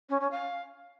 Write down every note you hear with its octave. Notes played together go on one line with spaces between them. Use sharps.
C#4
C#4
F5